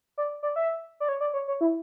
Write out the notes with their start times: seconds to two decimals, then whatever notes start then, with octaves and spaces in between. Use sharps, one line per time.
0.18 D5
0.43 D5
0.56 E5
1.00 D5
1.09 C#5
1.21 D5
1.34 C#5
1.48 C#5
1.61 E4